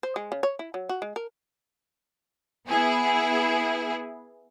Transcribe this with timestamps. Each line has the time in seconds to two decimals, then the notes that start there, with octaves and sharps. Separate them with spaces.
0.03 C5
0.16 G#3
0.32 C#3
0.43 C#5
0.59 E4
0.74 F#3
0.89 F#4
1.02 G#3
1.16 A#4
2.70 B3 E4 G#4